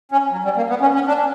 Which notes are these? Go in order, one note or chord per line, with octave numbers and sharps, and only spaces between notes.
C#4
F#3
G3
A#3
B3
C#4
C#4
D4